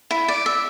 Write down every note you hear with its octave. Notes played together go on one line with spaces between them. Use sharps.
E4
D5
E5